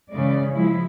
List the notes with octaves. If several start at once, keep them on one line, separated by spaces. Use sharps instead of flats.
C#3 E3 G#3 D5
F3 G#3 E4